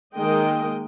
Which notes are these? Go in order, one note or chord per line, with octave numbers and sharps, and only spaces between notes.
D#3 G#3 A#3 D#5 G5